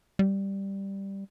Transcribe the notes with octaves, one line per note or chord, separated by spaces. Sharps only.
G3